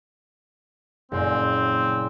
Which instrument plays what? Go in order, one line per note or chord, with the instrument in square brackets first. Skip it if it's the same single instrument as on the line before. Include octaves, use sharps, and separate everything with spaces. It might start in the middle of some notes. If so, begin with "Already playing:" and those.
[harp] F#1 A#2 [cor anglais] C4